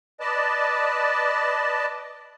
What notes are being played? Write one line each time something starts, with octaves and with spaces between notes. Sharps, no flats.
B4 D5 D#5 A5